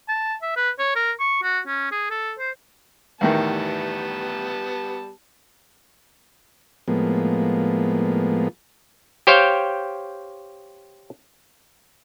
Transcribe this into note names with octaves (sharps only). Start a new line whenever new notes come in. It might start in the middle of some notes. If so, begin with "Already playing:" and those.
A5
E5
B4
C#5
A#4
C#6
F#4
C#4
G#4
A4
C5
E2 A2 D#3 G3 B3 A5
A2 F3 G#3 A#3 B3
G4 C5 C#5 F5 G5